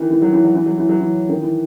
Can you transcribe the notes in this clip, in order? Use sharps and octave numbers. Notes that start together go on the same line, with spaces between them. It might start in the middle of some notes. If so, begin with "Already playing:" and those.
Already playing: D#3 E3
E3
F#3
E3
F#3
E3
F#3
E3
F#3
E3
D#3
E3